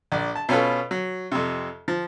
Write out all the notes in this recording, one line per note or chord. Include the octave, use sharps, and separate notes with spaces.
A#1 D5
A5
B2 C#4 F4 A4 B4
F#3
F2 C3
F3